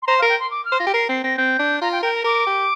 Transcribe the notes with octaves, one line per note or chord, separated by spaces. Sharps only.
C6
C5 A#5
A#4 F5
G5
C6
D6
F6
C5
F4 A#6
G4
A#4 C7
C4 C7
C4 A#6
C4 G6
D4
F4 A#5
G5
A#4 G5
A#5
A#4 D6
G4